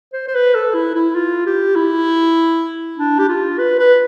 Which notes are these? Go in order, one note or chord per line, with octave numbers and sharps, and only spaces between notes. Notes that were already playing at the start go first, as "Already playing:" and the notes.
C5
C5
B4
A4
E4
E4
F4
G4
E4
D4
G4
F4
B4
B4